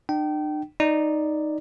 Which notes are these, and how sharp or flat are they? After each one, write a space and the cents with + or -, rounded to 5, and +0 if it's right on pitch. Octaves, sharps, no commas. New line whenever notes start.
D4 +45 G5 -25
D#4 -5 D5 +0